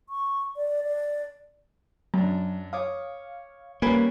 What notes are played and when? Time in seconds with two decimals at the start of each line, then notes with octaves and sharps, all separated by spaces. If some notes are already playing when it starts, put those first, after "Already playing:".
0.09 C#6
0.56 D5
0.84 D5
2.14 F#2 F#3 D4
2.73 C#5 F5 D6 D#6
3.82 G3 A#3 C#4 A#4 B4 G#5 B5